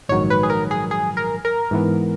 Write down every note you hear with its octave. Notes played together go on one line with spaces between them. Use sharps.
A#1 G#2 D#3 F#3 C#5
B4
G#4
A#4
G#4
G#4
A#4
A#4
G#2 E3 B3